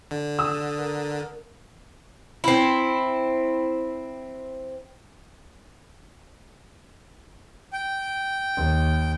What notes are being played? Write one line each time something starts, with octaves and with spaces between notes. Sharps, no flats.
D3
D#6 E6
A#4
C4 E4
G5
D#2